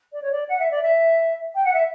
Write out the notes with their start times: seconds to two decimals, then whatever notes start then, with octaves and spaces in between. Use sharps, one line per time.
0.12 D5
0.21 C#5
0.32 D5
0.48 F#5
0.59 E5
0.70 D5
0.82 E5
1.54 G5
1.64 F#5
1.73 E5